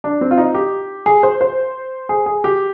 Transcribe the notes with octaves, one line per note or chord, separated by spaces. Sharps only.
D4
C4
F4
D#4
G4
G#4
C5
C5
G#4
G#4
G4